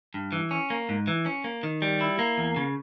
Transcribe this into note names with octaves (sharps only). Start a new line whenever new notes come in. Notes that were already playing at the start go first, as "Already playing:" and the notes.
G2
E3
C#4
A#3
G#2
E3
C#4
A#3
D#3
G3
E4
A#3
E2
C#3